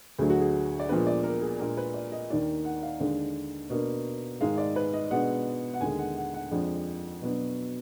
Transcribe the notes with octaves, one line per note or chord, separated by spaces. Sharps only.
D2 D3 F#3 D4 G#4
F#4
G#4
D5
A#2 F3 G#3 B3 D4 B4
D5
A#4
G#4
A#2 G#3 D4 A#4
B4
D5
D#5
D#2 D#3 A#3 D4 D5
F#5
F5
D#2 D3 G#3 D4
B2 A#3 D4
G#2 D#3 G#3 F5
D5
B4
D#5
B2 G#3 B3 D4 F#5
F#5
D#2 D3 G#3 G#5
F#5
F#5
F#5
F2 F3 G#3 D4
B2 F#3 B3 D4